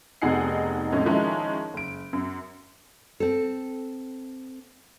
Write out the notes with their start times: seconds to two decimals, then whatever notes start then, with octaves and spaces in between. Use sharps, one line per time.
0.22 F1 B2 D#4 G#4 F#5 C7
0.92 F2 A2 G#3 C#4
1.05 D#3 F3 G#3 C#4 D#4 E4
1.74 F#1 D7
2.13 F#2
3.20 C4 A4